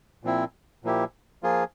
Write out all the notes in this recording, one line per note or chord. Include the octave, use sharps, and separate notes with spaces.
A#2 F3 C4 E4
A#2 F3 A#3 E4 G4
F3 A#3 F4 G#4